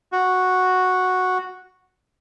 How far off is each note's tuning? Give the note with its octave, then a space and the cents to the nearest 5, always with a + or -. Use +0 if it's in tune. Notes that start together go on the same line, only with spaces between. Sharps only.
F#4 -5